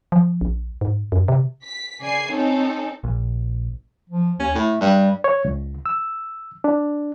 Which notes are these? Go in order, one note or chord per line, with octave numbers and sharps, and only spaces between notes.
F3
A#1
G#2
F#2
C3
B6
C#3 D5 G#5 C7
C4 C#4 D#4 A4
A#1
F3
D#2 C#4
A2 A3
G2 G3
C#5
C#2
E6
D4